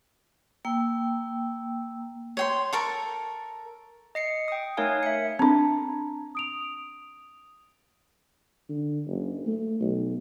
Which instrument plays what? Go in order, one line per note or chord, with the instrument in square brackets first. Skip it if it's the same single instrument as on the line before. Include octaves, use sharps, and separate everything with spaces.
[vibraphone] A#3 G5 E6
[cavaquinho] C#5 G5 C6
A4 A#4 C#6
[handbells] D#5 C7 C#7
G5 D#6
A3 D#4 A#4 C#5 F5 G#5
E5 C#7
[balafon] C4 D4 [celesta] A5 A#5
[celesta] D#6 D7 F7
[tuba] D3
F#1
A3
B1